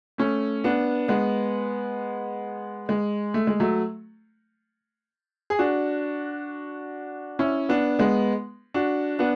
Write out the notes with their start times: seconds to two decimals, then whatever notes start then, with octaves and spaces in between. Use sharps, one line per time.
0.18 A3 C#4
0.64 B3 D4
1.08 G#3 B3
2.89 G#3
3.34 A3
3.47 G#3
3.60 F#3 A3
5.50 G#4
5.59 D4 F#4
7.39 C#4 E4
7.69 B3 D4
7.99 G#3 B3
8.74 D4 F#4
9.19 B3 D4